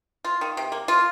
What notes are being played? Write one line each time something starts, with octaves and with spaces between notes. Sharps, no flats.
F4
D#3
C3
A#3
F4